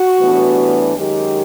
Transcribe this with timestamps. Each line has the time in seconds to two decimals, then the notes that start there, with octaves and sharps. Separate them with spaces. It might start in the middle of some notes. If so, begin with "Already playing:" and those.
Already playing: F#4
0.17 A2 E3 G3 B3 D4
0.96 F#2 D#3 G#3 G4